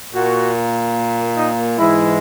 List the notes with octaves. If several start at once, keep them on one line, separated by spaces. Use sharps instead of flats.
A#2 A#3 F#4
D#4
G#2 E3 G#3 E4